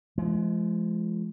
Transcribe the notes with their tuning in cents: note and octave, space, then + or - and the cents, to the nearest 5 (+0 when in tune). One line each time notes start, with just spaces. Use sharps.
F3 -30 G#3 +25